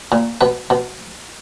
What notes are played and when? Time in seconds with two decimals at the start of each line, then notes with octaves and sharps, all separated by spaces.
0.12 A#2
0.41 B2 B4
0.70 B2